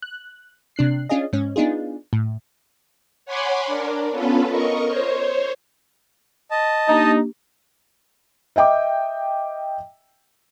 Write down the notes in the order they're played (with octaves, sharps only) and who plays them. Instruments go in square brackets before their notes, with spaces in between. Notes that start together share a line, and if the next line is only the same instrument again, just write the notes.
[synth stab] F#6
C3 D4 F#6 C7
C#4 D4 F4 G#4 D#5
G#2 C#4
B3 D4 D#4 F4 G#4
A2
[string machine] C#5 F#5 G#5 B5 C6 D6
D4 A#4
B3 C#4 F4 A4 B4
A#4 D#5 C#6
C5 C#5
[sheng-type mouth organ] D#5 A5
[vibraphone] A#3 D4 G4 [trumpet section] D#4
[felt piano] D#5 E5 G5 D6